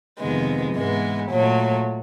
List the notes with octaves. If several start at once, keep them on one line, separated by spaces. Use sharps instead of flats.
F2 C3 D#3 G#3 B3
G#2 E3 G#3 B3
A#2 F#3 A3